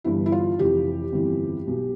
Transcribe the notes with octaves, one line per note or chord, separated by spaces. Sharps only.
G1 G2 E3 E4
E4
F4
F1 F2 E3 G4
G1 F2 E3
B1 B2